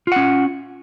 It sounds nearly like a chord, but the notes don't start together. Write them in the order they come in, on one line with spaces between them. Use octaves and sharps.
F4 F#5 C#4